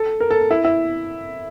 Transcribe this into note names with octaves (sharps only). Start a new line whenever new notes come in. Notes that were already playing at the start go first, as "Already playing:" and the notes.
Already playing: A4
A#4
A4
E4
E4